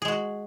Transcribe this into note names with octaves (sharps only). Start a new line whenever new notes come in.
G#3 F#4 G#4